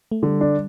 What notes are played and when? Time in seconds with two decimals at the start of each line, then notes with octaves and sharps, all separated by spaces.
0.12 A3
0.23 D3 G3
0.41 D4